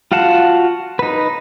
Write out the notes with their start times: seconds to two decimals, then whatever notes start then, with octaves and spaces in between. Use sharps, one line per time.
0.12 F4 F#4 F5 F#5 A5
0.99 D#4 B4